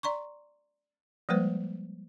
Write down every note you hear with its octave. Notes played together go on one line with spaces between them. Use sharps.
D5 A#5 C6 C#6
F3 G3 G#3 A#3 B4 C5